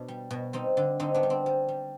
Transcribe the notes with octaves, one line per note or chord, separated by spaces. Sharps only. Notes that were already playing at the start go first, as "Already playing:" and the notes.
Already playing: B2 D4
G3
B2
G3 C4 D#4
D3
D3 C4 D#4
B3 D4
G3
C4
G3
G3